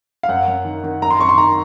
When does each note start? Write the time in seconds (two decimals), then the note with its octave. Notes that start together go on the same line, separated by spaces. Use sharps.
0.23 F5
0.29 F#2 F#5
0.48 F#2
0.65 D#3
0.84 D#3
1.02 F#2 A#5
1.11 C6
1.19 F#2 C#6
1.29 C6
1.38 D#3 A#5